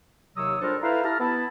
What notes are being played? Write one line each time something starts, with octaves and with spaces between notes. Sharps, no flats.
D#2 C3 F#3 C#5 D#6 E6
G3 D4 F4 A4 A#4 C5
E4 A4 B4 C5 F5 A#5
E4 G4 A5 A#5 F6
B3 E4 A5